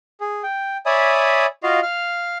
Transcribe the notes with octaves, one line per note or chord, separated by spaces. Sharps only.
G#4
G5
C#5 D5 E5 G#5 B5 D#6
F4 F#4 D#5 F5
F5 F6